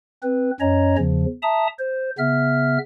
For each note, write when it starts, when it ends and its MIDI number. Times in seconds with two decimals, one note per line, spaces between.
0.23 0.51 60
0.23 0.51 71
0.60 0.96 42
0.60 0.96 61
0.60 0.96 73
0.60 0.96 75
0.60 0.96 82
0.98 1.25 40
0.98 1.25 49
0.98 1.25 53
1.42 1.67 76
1.42 1.67 81
1.42 1.67 82
1.42 1.67 87
1.79 2.10 72
2.18 2.78 49
2.18 2.78 59
2.18 2.78 76
2.18 2.78 89